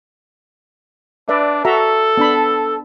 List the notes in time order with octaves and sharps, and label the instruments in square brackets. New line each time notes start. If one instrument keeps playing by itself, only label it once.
[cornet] D4 [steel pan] B4 D5 E5
[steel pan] F#4 E5 A#5 [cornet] A4
[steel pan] B3 D4 B5